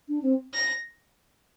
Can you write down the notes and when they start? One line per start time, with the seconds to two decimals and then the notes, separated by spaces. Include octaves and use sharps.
0.08 D4
0.22 C4
0.53 A#6